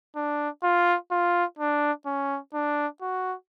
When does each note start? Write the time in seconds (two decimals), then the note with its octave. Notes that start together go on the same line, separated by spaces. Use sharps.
0.16 D4
0.63 F4
1.12 F4
1.59 D4
2.06 C#4
2.54 D4
3.02 F#4